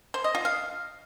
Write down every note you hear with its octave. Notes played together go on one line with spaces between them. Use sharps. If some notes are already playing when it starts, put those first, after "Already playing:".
C5
D#5
F4
F5